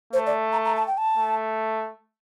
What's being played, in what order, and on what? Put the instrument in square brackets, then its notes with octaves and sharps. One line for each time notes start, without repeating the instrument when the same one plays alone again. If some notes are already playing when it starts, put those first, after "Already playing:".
[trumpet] A3 [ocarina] C5
[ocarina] D5
A#5
A#5
A5
G5
A5
[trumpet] A3